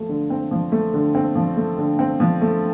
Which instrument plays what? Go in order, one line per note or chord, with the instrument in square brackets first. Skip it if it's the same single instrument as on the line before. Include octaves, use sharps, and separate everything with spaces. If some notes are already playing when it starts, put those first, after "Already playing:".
Already playing: [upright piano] F3 A3
D3
C4
F3
A3
D3
C4
F3
A3
D3
C4
F3
A3